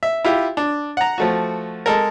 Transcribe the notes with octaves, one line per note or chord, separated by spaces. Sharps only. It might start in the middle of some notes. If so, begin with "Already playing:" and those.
E5
E4 F4 G4
D4
F#5 A#5
F3 A3 F#4
G#3 A4 A#4